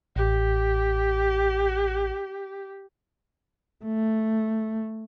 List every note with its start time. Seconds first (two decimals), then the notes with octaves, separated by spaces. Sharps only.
0.16 A1 G4
3.85 A3